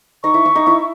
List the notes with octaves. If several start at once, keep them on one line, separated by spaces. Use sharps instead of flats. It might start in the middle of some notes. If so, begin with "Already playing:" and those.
D#4 D#5 C#6
E4 E5
E4 E5
D#4 D#5
E4 E5